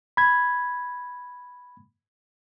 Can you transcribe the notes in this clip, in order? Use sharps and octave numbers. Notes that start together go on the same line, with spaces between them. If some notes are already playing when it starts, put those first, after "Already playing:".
B5 G#6